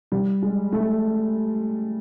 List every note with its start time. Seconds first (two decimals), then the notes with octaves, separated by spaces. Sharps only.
0.12 G3
0.42 G#3
0.72 A3